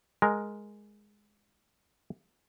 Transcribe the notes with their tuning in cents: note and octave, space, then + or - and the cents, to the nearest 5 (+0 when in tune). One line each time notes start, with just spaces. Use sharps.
G#3 +0 A#4 +0